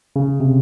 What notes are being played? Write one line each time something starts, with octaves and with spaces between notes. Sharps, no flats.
C#3
C3